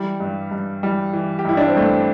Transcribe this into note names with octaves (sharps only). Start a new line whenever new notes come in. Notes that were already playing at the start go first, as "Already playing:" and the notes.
Already playing: E3 G3
G2
G2
E3 G3
E3
G4
G2 E4
D4
C4
G2 A3